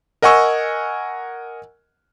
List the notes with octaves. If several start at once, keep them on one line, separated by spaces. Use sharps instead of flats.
A#4 D#5 F#5 G#5 C#6 E6